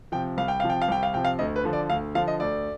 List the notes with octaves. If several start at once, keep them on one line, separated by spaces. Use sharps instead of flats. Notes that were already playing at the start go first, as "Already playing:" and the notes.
C3 F3 G5
C2 F5
G5
C3 F3 F5
G5
F5
C2 G5
F5
C3 F3 G5
F5
D2 D#5
B4
D3 F3
D5
D2 F5
D3 F3 F5
D#5
D2 D5